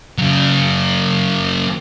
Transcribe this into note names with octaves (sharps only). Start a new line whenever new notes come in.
C#3 F#3